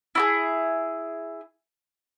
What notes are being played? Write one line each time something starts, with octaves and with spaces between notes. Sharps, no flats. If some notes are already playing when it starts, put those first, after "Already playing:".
E4 F#4 G#4